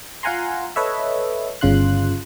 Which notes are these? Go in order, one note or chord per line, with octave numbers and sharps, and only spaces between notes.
F4 F5 F#5 G#5 A#5 C6
A4 B4 C#5 D#5 E5
G1 C#3 F4 C6 F#6